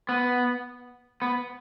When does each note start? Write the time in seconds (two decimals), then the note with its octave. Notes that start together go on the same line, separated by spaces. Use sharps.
0.09 B3
1.22 B3